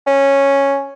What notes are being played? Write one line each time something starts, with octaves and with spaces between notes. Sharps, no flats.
C#4